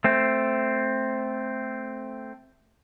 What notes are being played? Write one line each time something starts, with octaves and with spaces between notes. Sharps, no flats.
A3 C4